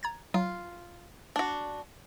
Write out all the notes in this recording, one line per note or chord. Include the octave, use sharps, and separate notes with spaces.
A#5 G#6 A6
F#3 F4
D4 F#4